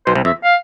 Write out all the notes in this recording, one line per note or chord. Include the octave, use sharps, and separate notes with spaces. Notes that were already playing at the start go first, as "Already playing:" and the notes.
B1 B2 C5
C2 C3
F2 E5
F5